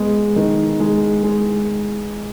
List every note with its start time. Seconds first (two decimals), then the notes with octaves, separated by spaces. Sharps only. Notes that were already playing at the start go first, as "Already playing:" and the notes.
Already playing: G#3 B3
0.36 D#3
0.80 G#3
1.24 G#3